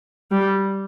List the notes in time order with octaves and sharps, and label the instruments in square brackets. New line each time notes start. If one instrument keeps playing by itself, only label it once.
[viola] G3